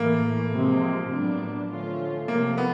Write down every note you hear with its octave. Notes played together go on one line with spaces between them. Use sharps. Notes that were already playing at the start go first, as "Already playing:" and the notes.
Already playing: A2 E3 A3 A#3
C3 F3 G#3 C4
A2 F#3 B3 D4
D3 F3 A3 C#4 F4
C3 F3 A3 A#3
B3